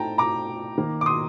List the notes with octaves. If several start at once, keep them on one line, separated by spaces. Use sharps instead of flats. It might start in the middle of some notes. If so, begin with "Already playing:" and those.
Already playing: A2 A3 D#4 G5 A5 A#5
A#5 D6
D#3 A#3 D#4
D6
C6 D#6